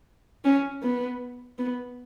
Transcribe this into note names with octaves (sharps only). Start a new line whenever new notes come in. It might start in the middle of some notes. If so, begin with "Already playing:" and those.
C#4
B3
B3